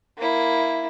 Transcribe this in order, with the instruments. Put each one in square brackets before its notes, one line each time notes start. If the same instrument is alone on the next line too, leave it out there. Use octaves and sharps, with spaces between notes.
[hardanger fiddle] A#3 E4